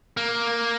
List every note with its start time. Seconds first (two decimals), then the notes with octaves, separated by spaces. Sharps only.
0.17 A#3